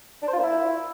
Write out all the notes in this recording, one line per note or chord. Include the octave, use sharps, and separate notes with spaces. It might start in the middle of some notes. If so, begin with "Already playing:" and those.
D4
C5
F4
A#3
E4